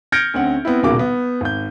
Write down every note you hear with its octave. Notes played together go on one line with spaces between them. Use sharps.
F6 G6 G#6 A#6 C#7 D7
D2 C4 C#4 F#5
B3 C4 E4
D#1 B1 C#3 A#3 F#4 D6
B3
G#1 G6